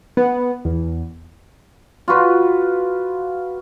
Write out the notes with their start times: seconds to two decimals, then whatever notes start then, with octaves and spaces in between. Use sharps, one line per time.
0.17 B3
0.65 E2
2.08 F4 F#4 B4